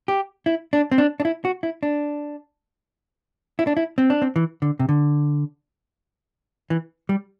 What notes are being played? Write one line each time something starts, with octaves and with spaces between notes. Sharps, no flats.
G4
E4
D4
C4
D4
D4
E4
F#4
E4
D4
E4
D4
E4
C4
D4
C4
E3
D3
C3
D3
E3
G3